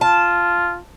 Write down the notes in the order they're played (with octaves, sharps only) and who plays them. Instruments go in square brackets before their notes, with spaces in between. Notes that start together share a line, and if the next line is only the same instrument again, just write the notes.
[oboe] F4 [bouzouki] A5